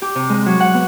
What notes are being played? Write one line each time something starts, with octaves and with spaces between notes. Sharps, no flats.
G4
C3
G#3
F#3
F#5
B3